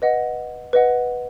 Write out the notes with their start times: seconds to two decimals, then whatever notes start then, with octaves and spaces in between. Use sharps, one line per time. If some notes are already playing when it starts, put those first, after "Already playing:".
0.02 B4 D#5 F#5
0.73 B4 D#5 F#5